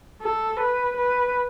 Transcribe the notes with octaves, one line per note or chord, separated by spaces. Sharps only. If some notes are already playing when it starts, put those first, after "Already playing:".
A4
B4
B4